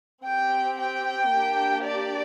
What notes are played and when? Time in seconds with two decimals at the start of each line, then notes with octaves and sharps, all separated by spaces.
0.24 C4 G4 G5
0.77 G5
1.32 A#3 D4 G4
1.86 D5